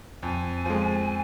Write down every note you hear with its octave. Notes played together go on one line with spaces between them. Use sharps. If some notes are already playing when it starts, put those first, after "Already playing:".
F2 G#5
F3 G#3